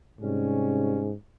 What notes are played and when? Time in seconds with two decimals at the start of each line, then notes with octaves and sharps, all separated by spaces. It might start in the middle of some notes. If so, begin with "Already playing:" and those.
0.20 G#2 C3 G3 C#4